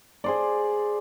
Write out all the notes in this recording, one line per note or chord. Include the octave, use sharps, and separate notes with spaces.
G#4 C5 D5